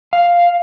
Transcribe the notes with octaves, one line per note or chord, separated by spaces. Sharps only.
F5